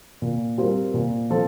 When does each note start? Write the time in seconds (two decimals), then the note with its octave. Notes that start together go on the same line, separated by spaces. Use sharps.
0.22 A#2
0.58 G3 C4 F4 A#4
0.94 A#2
1.30 F3 C4 F4 A4